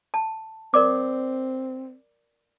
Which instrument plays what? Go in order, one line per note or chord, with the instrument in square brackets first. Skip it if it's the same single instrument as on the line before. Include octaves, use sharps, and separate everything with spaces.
[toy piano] A5
[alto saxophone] C4 [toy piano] A#4 D5 D6